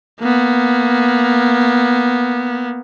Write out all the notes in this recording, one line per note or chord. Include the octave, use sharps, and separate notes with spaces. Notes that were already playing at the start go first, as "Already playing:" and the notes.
A#3 B3